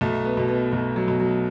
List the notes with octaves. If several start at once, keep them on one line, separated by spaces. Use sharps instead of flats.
B1 A3
B3
B2
B3
B1 A3
F#3
B2
F#3